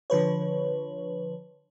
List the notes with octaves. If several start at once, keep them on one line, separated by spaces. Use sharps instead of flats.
D3 F3 B4 C#5